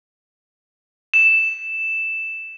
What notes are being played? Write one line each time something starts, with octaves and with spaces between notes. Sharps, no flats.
E7